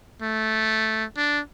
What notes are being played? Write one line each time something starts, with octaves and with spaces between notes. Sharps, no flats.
A3
D4